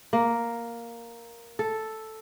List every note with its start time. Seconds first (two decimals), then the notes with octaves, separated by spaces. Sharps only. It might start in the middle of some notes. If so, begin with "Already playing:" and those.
0.13 A#3
1.59 A4